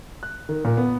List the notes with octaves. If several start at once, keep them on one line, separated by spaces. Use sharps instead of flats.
F#6
D#3
A#2
B3